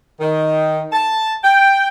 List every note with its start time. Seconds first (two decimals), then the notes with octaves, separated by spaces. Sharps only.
0.20 D#3
0.93 A5
1.44 G5